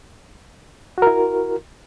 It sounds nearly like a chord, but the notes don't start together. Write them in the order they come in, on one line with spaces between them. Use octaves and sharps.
F#4 A#4 E4